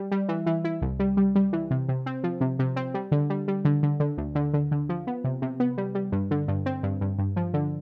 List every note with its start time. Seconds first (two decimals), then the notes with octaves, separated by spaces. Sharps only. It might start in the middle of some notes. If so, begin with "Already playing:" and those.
Already playing: G3
0.11 G3
0.29 E3
0.46 E3
0.64 E4
0.82 C2
0.99 G3
1.17 G3
1.35 G3
1.53 E3
1.71 C3
1.89 C3
2.06 C4
2.24 F3
2.41 C3
2.59 C3
2.76 C4
2.94 G3
3.12 D3
3.30 G3
3.48 G3
3.65 D3
3.83 D3
4.00 D3
4.18 D2
4.35 D3
4.54 D3
4.71 D3
4.89 F3
5.07 B3
5.24 C3
5.42 C3
5.60 B3
5.78 G3
5.95 G3
6.12 G2
6.31 D3
6.48 G2
6.66 C4
6.83 G2
7.01 G2
7.18 G2
7.36 F3
7.54 D3